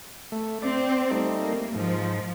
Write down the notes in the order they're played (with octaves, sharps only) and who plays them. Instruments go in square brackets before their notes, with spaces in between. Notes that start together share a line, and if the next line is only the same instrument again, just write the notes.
[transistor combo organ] A3
[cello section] C4 [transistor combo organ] D5
[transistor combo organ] G3 A3 D#4
[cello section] A#3
[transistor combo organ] G#2 [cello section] F3